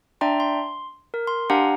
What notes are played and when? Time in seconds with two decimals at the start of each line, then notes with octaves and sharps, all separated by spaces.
0.21 D4 D5 E5 G5 A#5 C6
0.40 C6
1.14 A#4
1.27 C6
1.50 D4 G4 F5 F#5 G#5 A#5